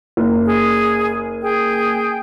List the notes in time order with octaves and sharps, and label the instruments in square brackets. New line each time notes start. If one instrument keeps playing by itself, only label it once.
[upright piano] F#1
[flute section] G#4
G#4 G5